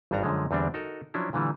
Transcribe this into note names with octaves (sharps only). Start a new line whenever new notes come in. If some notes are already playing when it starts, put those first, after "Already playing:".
G#1 G2 G3 D4 F#4 A#5
F#2 D3 F3 G#3
E2 D3 G3 C4 D4
D#4 F#4 A4 A#4
F3 F#3 C#4 D4 E4
A#2 D3 E3 G3